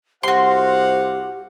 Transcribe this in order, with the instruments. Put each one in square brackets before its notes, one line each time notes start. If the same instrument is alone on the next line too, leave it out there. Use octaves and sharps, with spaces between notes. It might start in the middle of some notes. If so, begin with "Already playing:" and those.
[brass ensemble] C2 F5 F#5 [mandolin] F#4 C6 [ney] G4 [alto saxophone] C5